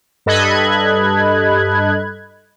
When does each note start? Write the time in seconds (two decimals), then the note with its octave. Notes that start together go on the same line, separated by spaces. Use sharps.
0.26 G2 A4 D#5 B5 F#6 G#6